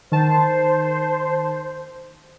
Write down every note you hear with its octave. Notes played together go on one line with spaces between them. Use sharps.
D#3 C5 A5